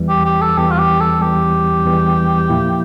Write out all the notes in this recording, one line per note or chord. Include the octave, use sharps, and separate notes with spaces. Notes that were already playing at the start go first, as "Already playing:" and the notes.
Already playing: E2 E3 G3
G4
G4
A4
E2 E3 G3 G4
F4
G4
A4
E2 E3 G3 G4
E2 E3 G3
A#2 F3 A#3 E4